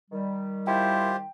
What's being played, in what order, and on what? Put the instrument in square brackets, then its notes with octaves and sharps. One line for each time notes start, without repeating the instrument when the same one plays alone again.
[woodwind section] D#3 G3
[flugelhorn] E4 [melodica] F4 G4 C5 [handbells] G5